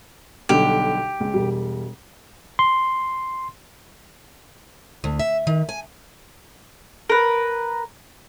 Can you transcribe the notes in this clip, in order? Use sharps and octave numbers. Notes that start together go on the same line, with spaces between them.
B1 D3 G3 G4
C#2
E1 G3
C6
D2
E5
D#3
G#5
A#4 B4